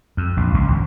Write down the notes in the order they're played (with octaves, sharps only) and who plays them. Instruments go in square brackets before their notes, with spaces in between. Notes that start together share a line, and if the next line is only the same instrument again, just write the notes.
[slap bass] F2
A#1
C#2
G#1